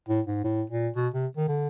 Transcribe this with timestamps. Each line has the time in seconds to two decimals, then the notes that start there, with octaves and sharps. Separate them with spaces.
0.09 A2
0.27 G#2
0.44 A2
0.70 A#2
0.96 B2
1.14 C3
1.37 D#3
1.48 D3